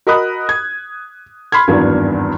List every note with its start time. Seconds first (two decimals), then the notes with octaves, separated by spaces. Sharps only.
0.07 F#4 A#4 D#5 B5 D#6 F#6
0.49 G#6
1.52 B5 C6 F6 G#6
1.68 G#1 E2 G2 F#3 B3 D4